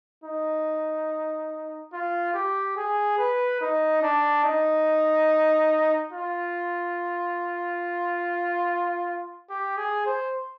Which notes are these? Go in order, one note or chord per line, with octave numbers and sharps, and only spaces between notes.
D#4
F4
G4
G#4
B4
D#4
D4
D#4
F4
G4
G#4
C5